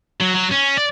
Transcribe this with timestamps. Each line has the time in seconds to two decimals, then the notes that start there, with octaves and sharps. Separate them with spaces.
0.20 F#3
0.35 F#3
0.51 C#4
0.77 D5